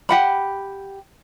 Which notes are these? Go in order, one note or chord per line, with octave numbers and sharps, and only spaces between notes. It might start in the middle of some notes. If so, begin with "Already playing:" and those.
G4 F#5 B5